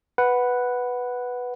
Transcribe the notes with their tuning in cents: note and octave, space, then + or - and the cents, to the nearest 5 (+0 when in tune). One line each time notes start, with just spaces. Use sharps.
B4 +0 F#5 +0